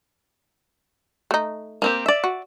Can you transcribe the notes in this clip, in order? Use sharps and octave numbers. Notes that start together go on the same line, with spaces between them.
A3 D#4
A#3 C4 G4
D5 E5
F#4